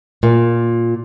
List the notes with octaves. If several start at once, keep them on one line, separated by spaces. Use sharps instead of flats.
A#2